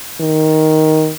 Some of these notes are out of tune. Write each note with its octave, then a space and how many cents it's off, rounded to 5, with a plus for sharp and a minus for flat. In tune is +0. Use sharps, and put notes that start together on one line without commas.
D#3 +5